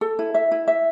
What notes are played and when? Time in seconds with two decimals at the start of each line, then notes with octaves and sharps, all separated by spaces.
0.01 A4
0.19 E4
0.34 E5
0.52 E4
0.68 E5